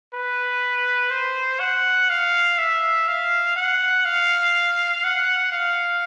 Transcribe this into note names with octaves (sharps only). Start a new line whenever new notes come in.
B4
C5
F#5
F5
E5
F5
F#5
F5
F#5
F5